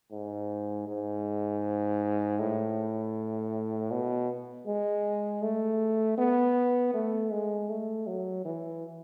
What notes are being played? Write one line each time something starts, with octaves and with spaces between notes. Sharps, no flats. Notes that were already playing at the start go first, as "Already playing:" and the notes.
G#2
G#2
A2
B2
G#3
A3
B3
A3
G#3
A3
F#3
E3